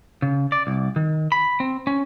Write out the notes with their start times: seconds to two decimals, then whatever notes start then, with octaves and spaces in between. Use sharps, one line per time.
0.22 C#3
0.52 D5
0.67 C2
0.96 D#3
1.32 B5
1.60 C4
1.87 C#4